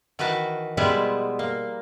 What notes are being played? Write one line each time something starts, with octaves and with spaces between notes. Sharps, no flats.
D#3 E3 F#4 B4 A5
B2 F3 G3 G#3 B3 E4
A#3